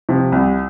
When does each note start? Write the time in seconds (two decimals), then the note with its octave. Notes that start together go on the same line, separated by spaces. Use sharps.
0.09 C3 F3
0.32 C2